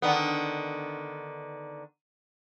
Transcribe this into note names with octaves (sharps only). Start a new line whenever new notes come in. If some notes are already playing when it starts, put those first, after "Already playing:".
D3 D#3 B3